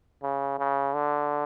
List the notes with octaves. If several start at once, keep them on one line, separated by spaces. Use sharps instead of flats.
C#3
C#3
D3